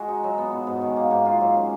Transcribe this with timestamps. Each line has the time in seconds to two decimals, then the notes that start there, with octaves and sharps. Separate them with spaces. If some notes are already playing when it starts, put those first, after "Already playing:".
Already playing: G#3 F#4
0.08 D#4
0.24 F#3
0.38 B3
0.53 B2
0.67 G#2
0.82 D#3
0.96 A#3
1.11 G#2
1.25 F4
1.41 F#3
1.56 C#4